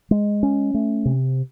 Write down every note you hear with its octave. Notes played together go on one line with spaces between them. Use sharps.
G#3
C#4
A3
C3